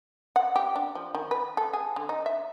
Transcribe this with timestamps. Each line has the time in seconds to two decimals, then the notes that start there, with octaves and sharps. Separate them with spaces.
0.36 F#5
0.56 G4
0.76 D4
0.95 F3
1.15 D#3
1.31 B4
1.57 A4
1.73 G#4
1.96 D3
2.09 D#4
2.26 E5